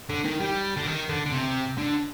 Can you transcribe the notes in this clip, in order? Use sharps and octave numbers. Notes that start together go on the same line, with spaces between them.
D3
D#3
G3
D3
D#3
D3
D3
C3
D3